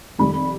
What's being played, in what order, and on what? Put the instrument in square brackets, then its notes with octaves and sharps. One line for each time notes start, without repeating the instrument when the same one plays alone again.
[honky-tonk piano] F2 C3 D#3 G3 B5